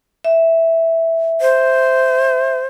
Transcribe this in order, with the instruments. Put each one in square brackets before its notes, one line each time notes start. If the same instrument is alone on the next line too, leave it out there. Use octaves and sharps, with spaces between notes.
[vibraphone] E5
[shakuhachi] C5